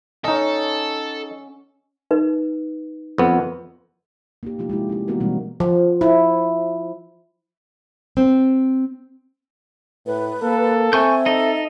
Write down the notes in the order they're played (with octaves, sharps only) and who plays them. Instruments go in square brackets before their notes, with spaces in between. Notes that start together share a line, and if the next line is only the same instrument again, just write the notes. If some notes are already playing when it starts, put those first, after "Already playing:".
[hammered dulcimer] C#4 F#5 C#6 [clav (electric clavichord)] D#4 D#5 [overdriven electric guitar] A4
[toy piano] D#4 B4
[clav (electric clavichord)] F2 B3
[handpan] A#3 D#4 G4
C3 F3 A3 D#4 F4 G4
G#3 E4 G4
C#4 E4 G4
E3 A#3 B3 D#4 F#4 A#4
B2 E3 G3 G#3 A#3 C4
F3
E4
[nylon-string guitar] C4
[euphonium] A2 [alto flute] B4
[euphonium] A#3 [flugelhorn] A4
[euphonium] C4 [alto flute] E5 [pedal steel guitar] G#5 C#6 G6
[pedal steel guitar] D#4 D#5 [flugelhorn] A4